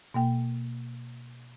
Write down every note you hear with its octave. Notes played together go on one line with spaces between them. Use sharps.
B2 A#3 G5